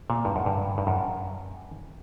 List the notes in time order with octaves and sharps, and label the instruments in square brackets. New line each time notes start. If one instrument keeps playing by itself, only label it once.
[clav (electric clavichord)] A#2
G2
F#2
G2
G2
F#2